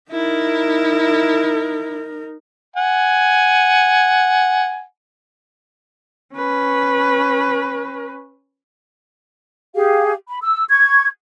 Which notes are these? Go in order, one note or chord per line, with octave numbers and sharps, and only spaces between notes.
D#4 E4 A#4
F#5 G#5
C#4 B4
G4 G#4 F5
B5
E6
C#6 G#6